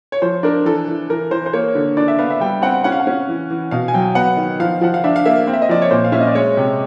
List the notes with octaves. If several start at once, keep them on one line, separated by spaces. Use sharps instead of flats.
C#5
F3 C5
D4 A#4
E3 A4
E3
E3 A#4
E3 C5
C5
A#3 C#5
D3
D4 D5
E5
B3 F5
E5
G3 G5
C4 F#5
C#4 F#5
F5
F#5
C#4
E3
E3
B2 F5
G#5
F#3 G5
B3 F#5
D#3
F3 F5
F3 F#5
F5
D4 E5
F5
A#3 E5
C4
E5
D#5
F3 D5
C#5
A#2 C5
F5
C#4 E5
D#5
D5
G#3 C#5
C3